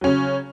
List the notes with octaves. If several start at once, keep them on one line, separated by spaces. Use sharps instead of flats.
C#3 F#3 C#4